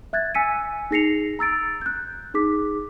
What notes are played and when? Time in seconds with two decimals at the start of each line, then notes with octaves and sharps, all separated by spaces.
0.13 E5 F#6 G#6 A6
0.35 G#5 E6 B6 C#7 D#7
0.91 D#4 G#4 A#6 C7 C#7 F7
1.39 A#5 E6 A6 D7
1.81 F#6 G6
2.34 D#4 G#4 D6 B6